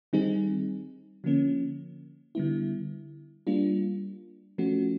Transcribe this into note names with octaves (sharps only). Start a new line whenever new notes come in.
D#3 G3 C4 D#4 G#4
D3 F3 A#3 C#4
D3 G3 B3 E4
G3 A#3 D4 F4
F3 A3 C#4 F#4